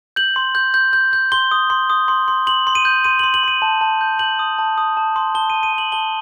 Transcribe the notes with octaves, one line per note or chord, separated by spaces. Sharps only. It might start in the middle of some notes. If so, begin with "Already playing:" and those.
G6 F#7
C6
G6
G6
G6
G6
C6 G7
D#6
C6
D#6
C6
C6
C6 F#7
C6
D#7
G6
C6 D#7
C6 F#7
F#7
C6 D#7
A5
A5
G6
G6 F#7
D#6
A5
D#6
A5
C6
A5 G7
A5 D#7
D#7
A5
F#7
A5 G7